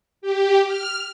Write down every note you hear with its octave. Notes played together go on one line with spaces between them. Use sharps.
G4
F6